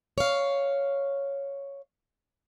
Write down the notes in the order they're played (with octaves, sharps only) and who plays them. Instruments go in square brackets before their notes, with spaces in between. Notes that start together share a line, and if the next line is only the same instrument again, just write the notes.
[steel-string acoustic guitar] C#5 F5